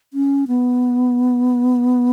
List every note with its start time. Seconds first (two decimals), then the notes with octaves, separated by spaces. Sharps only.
0.14 C#4
0.48 B3